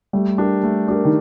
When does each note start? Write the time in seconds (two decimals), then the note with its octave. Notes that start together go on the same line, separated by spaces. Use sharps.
0.13 G3 A3
0.38 D4 G4 A#4
0.63 A3
0.88 D4 G4 A#4
1.05 D#3